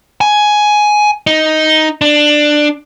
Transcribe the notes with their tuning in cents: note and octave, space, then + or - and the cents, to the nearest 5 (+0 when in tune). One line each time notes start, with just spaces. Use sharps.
G#5 +10
D#4 +5
D4 +15